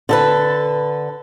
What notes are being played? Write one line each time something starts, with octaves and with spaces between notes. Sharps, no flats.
D3 A4 B4